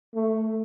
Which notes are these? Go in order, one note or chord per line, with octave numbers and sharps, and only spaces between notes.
A3